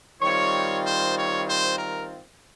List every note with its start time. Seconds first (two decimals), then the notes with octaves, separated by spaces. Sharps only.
0.22 D#3 G3 C4 F4 C#5
0.84 C5
1.15 C#5
1.46 C5
1.76 A#4